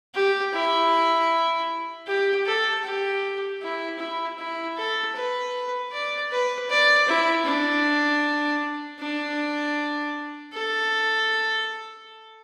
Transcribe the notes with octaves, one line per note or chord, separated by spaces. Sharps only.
G4
E4
G4
A4
G4
E4
E4
E4
A4
B4
D5
B4
D5
E4
D4
D4
A4